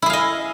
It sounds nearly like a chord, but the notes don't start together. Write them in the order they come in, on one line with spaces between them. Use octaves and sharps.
E4 G#4 F5 D#5